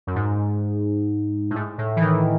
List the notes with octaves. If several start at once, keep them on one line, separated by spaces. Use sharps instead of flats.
F#2
G#2
A2
G#2
A2
E3
D#3